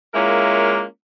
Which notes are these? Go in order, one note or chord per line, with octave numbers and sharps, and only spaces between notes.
G#3 A#3 C#4 E4 F4 A#4